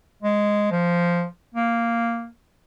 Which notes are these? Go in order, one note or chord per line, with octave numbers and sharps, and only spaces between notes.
G#3
F3
A#3